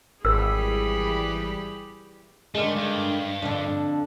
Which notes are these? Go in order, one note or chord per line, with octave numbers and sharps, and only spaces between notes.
G#1 E3 G3 G4 G#4 A#4 B5 E6
D3 D#3 G#3 A3
G2
F2 D3